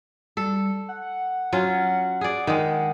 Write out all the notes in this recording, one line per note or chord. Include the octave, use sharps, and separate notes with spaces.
G3 A4
F#5
F#3 C#4 F4
G#4 D5
D#3 G#3 F#5